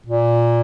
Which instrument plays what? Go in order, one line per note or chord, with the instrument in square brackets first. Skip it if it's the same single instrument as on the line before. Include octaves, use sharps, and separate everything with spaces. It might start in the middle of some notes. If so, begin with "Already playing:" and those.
[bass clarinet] A#2